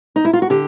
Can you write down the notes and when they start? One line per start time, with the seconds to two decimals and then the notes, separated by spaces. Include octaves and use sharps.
0.16 D#4
0.25 E4
0.33 F4
0.42 F#4
0.50 D3 G4